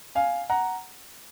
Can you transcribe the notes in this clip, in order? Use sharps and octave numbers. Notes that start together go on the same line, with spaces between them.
F5 G#5
F#5 A#5